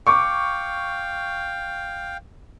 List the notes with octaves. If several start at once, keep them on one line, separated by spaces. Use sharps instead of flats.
F5 G5 C#6 D6